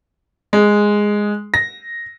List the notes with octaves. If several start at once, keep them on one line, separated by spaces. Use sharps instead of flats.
G#3
A#6